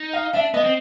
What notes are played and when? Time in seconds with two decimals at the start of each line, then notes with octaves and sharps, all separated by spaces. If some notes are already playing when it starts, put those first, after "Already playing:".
Already playing: D#4
0.13 F5
0.33 D4 E5
0.54 B3 D#5
0.64 C4